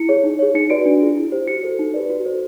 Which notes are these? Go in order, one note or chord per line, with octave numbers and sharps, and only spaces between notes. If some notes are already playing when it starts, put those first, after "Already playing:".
Already playing: E4 C#7
G#4 C#5
D#4
G#4 C#5
D#4 C#7
F#4 B4 D5 D7
D4
F4 G#4
E4
G4 C5
F#4 C#7
A4 C5
D#4
G4 B4 D5
F#4
A4 C5